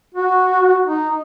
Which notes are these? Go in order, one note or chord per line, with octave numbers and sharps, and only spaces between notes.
F#4
D#4